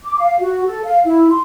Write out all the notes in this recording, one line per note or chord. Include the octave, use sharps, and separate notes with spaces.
D6
F5
F#4
A4
F5
E4
C6